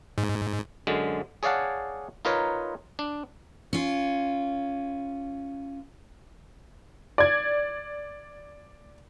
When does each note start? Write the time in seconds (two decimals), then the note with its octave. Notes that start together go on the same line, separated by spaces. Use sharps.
0.18 G#2
0.87 F#2 D3 G#3
1.43 G#4 C#5 D5 F5 F#5 A5
2.25 D#4 F4 A#4 B4 C#5
2.99 D4
3.73 C#4 F4
7.18 D5 G#6